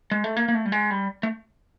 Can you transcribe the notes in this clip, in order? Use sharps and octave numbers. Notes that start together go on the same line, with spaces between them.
G#3
A3
A#3
A#3
A3
G3
G#3
G3
A3